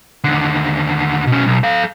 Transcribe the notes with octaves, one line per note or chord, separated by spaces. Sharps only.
D#2 D3
B2 C#4
B1
A4 F5